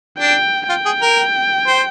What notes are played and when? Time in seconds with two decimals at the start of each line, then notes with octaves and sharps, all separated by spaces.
0.19 D4 G5
0.69 F4 G5
0.86 G#4
1.02 A#4
1.67 C5